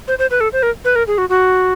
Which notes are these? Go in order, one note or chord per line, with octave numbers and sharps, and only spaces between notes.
C5
C5
B4
A4
C5
A#4
B4
A#4
G#4
F#4
F#4